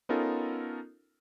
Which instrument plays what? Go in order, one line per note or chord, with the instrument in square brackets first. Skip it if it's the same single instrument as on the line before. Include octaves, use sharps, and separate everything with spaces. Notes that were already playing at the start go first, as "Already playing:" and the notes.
[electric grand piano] B3 C#4 D#4 F4 A4 A#4